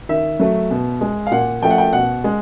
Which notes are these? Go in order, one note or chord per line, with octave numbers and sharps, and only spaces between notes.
D#3 E5
F#3 A3
B2
G#3
F5
A#2 F#5
F3 A3 G5
F#5
G5
B2 F#5
G#3